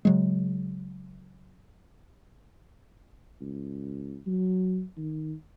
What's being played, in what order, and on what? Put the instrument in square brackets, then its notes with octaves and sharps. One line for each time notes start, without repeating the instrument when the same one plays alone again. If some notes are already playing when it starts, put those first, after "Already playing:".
[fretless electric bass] C#3 F#3 G#3
[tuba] C#2
F#3
D#3